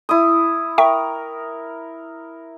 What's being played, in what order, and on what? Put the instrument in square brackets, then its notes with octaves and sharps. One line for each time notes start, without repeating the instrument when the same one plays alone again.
[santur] E4 D#6
[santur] A#4 [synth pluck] E5 G5 C#6